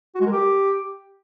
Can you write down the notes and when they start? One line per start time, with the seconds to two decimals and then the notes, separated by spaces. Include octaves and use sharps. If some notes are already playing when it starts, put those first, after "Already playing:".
0.15 F#4
0.21 G#3
0.27 A#4
0.32 G4